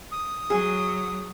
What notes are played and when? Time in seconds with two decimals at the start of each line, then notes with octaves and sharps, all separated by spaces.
0.12 D#6
0.50 F#3 G#4